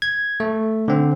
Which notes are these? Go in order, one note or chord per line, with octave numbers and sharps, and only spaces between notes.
G#6
A3
D3 C4